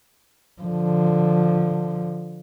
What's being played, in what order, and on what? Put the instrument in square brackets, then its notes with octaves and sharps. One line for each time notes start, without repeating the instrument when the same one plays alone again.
[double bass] D3 F3